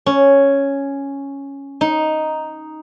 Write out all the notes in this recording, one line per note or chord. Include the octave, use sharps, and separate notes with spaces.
C#4
D#4